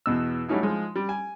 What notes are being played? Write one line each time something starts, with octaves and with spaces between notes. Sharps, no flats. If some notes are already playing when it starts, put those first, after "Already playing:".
E2 B2 E6
F#3 G3 A3 C#4 D#4 E4
F3 G#3 D#4
G3
G#5